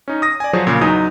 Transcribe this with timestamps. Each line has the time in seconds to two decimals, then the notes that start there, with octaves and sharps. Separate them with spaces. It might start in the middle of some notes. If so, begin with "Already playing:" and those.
0.08 C#4 D#4
0.22 D#6 A#6
0.40 D5 G#5
0.53 F3 F#3 F#4 G#4 C5 C#5
0.67 A#2 C#3
0.81 E2 F#3 D#4 D#6